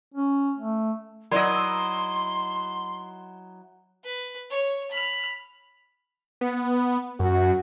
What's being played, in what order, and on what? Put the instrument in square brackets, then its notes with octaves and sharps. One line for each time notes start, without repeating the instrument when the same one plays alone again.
[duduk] C#4
A3
[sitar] F#3 E4 D#5 [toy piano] A#4 D5 B5 [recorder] C6
[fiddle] B4
C#5
B5 F6
[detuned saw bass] B3
[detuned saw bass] F#2 [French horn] F#4